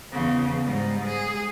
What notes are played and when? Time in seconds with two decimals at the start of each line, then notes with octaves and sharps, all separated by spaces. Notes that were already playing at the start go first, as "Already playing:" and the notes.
0.12 E2 C#3
0.65 G#2 G3
1.08 G#4